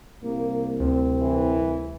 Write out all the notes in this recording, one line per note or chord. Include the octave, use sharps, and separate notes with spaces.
C2 A#3
D2 C4
E3